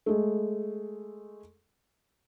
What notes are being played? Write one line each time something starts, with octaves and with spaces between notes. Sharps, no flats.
G#3 A3